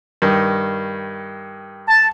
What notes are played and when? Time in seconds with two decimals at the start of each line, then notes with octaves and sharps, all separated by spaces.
0.22 G2 D#3
1.87 A5